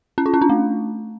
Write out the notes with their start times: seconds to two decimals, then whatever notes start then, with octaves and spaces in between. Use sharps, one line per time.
0.18 C#4
0.26 F4
0.34 C#4
0.41 D4
0.49 A3